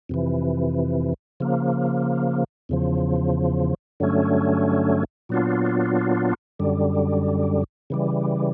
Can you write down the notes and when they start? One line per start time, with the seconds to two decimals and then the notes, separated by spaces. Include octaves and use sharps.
0.09 F2 C3 E3
1.40 C#3 F3 A#3
2.69 E2 C#3 F3
4.00 G2 D3 F#3 A3 C#4
5.29 A#2 F#3 B3 D4 F4
6.59 F#2 D3 G3
7.90 C#3 E3 G3